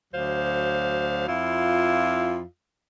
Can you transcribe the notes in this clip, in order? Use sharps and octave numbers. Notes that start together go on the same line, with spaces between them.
D2 F#3 C5 F5
F2 E4 F4